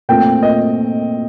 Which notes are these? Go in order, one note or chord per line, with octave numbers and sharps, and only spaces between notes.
A#2 A3 C4 G5
D#5